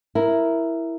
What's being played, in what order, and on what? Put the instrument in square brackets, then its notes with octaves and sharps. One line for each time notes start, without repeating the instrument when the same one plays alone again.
[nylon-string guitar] E4 A#4